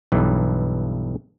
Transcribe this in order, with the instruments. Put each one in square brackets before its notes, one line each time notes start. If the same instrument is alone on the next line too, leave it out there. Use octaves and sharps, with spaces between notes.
[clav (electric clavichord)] B1 G2 E3